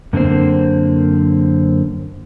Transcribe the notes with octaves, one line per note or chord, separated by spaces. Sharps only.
F#2 D3 A#3 C4 C5